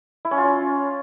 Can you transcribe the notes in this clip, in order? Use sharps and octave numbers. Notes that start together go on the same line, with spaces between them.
E4
C#4
F4
C#4